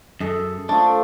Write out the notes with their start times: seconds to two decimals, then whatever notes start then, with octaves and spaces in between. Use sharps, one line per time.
0.20 F#2 G#4 A4 E5
0.69 F3 A3 D4